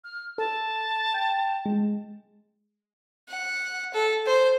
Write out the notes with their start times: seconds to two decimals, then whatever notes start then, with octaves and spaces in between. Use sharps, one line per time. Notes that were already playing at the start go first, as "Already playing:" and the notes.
0.04 F6
0.38 A4 A5
1.14 G5
1.66 G#3
3.29 F#5
3.93 A4
4.26 C5